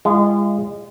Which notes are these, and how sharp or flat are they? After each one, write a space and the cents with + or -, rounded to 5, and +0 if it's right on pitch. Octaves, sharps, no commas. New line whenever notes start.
G#3 -30 F4 -40